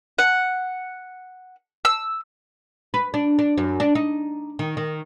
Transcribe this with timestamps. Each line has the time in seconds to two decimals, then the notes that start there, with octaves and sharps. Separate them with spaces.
0.19 F#5
1.85 E6
2.94 B4
3.14 D4
3.39 D4
3.58 F#2
3.80 D4
3.95 D#4
4.59 D#3
4.77 D#3